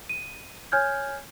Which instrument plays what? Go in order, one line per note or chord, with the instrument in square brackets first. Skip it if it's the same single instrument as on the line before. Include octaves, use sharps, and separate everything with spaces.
[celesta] D#7
C#5 G#5 F6 G6 G#6